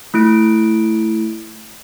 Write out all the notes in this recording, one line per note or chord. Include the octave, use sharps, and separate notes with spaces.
A3 E4 D7